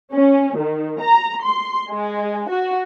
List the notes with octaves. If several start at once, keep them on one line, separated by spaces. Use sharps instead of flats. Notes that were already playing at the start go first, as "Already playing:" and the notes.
C#4
D#3
A#5
C6
G#3
F#4